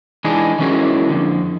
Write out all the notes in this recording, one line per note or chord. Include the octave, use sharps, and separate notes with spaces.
E3 G#3 D4 D#4 G#4
E3 F#3 G#3 C#4 E4 A#4
F2 D3